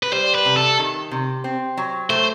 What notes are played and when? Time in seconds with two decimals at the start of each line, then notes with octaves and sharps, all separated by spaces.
0.03 B4
0.12 G3 C5
0.35 B4
0.45 C3
0.57 A4
0.79 D#3
1.11 C3
1.44 C4
1.77 F#3
2.10 A3 C5